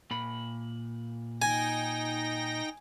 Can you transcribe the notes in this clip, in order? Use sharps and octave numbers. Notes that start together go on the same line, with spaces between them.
A#2 B5
D#4 G5 G#5 A#6